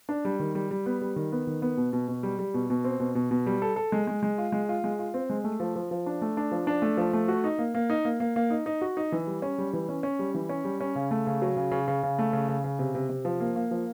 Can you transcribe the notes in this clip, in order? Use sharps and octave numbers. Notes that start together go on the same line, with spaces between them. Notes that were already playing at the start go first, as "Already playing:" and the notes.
D4
G3
D#3
G3
G3
B3
G3
D#3
B3
D#3
B3
B2
B2
B2
G3
G3
B2
B2
C4
B2
B2
B2
G3
A4
A4
G#3
G#3
G#3
F4
G#3
F4
G#3
F4
C4
G#3
A3
F3
F3
F3
D4
A3
D4
F3
D4
A3
F3
A3
F#4
D#4
A#3
A#3
D#4
A#3
A#3
A#3
D#4
D#4
F#4
D#4
E3
G3
C#4
G3
E3
C#4
C#4
G3
E3
C#4
G3
C#4
C#3
A3
C#3
F#3
C#3
C#3
C#3
C#3
A3
C#3
C#3
C#3
C3
C3
C3
F3
A#3
A#3
F3